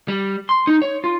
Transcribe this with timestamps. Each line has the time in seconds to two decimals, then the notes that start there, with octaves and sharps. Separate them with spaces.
0.08 G3
0.49 C6
0.67 D#4
0.82 C#5
1.04 F4